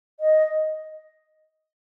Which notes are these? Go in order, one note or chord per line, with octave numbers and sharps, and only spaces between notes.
D#5